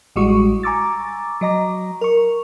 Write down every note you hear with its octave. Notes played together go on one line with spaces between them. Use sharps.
A1 G3 G#3 F#4 C#6
G#5 A#5 C#6 D6 E6 A6
F#3 D#5 A#5 D6
A#4 C#6